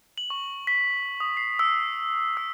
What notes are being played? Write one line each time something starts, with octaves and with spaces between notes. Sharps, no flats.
F#7
C#6
B6
D#6
C7
E6
E6